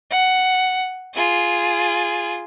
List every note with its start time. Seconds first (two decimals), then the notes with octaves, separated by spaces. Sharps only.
0.11 F#5
1.14 F4 G#4